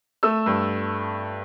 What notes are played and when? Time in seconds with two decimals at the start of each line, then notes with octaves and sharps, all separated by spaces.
0.23 A3 E6
0.46 G2